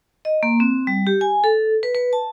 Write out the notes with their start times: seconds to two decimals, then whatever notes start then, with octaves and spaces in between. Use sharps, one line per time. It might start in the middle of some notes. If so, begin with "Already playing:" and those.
0.25 D#5
0.43 A#3
0.60 C4
0.87 G3
1.07 G4
1.21 G#5
1.44 A4
1.83 B4
1.95 B4
2.13 A5